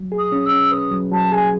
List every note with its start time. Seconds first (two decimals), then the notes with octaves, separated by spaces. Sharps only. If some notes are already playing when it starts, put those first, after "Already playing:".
Already playing: F#3
0.12 G#4
0.18 D#6
0.32 C#4
0.45 E6
0.52 C#4
0.71 B4 D#6
0.91 F#3
1.11 F#3 A5
1.32 G#4 G#5